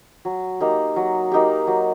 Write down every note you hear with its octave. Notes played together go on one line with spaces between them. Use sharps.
F#3
A#3 D#4 G4
F#3
A#3 D#4 G4
F#3